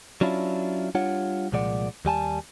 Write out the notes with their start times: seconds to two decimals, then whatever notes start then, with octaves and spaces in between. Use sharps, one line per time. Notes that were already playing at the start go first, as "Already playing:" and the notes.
0.21 F#3 C#4 D4 E4 F4
0.95 G3 D4 F4 C#5 F#5
1.52 C2 A#2 F3 G#3 D5 F#5
2.05 D#2 G3 G#5 A5